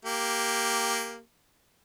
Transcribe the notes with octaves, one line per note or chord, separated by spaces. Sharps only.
A#3 G4